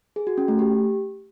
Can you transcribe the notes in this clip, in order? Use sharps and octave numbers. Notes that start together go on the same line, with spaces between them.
G#4
F#4
C#4
A3
G4